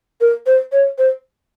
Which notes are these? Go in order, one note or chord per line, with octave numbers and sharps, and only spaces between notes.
A#4
C5
C#5
C5